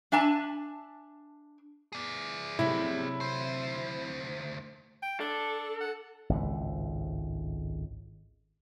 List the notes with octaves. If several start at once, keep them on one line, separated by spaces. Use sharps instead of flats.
D4 E5 G#5 A5
G#4 D5
C3 F#3 A3 E4
D2 C5
G5
D4 A4
F#5
G#1 C#2 A2